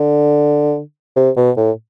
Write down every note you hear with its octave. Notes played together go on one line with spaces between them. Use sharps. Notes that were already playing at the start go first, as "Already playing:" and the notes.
Already playing: D3
C3
B2
A2